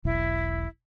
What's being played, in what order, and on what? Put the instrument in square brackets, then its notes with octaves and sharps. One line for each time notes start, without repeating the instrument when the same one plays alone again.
[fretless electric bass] E1 B1 [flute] E4